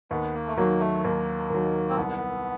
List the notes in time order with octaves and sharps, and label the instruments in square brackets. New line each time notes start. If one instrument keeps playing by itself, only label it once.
[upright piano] D#2 [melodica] B3
[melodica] A#3
A3
[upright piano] D#3 F#3 [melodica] A#3
[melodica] A3
[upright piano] D#2 [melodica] A#3
[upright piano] D#3 F#3
[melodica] C4
[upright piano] C2 [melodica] B3